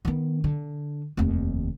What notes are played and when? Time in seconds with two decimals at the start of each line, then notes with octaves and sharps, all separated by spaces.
0.05 D#3 B3
0.44 D3
1.17 F1 D#2